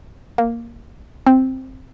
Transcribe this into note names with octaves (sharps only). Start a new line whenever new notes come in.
A#3
C4